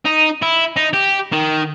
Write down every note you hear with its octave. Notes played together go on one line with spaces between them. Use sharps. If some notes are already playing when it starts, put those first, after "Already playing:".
D#4
E4
D#4
G4
D#3